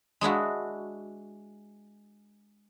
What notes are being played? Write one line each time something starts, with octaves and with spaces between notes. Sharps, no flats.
G#3 D4 E4 F#4